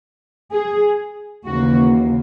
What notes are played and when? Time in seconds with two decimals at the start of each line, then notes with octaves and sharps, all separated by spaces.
0.51 G#4
1.45 D#2 C#3 E3 A#3 F#4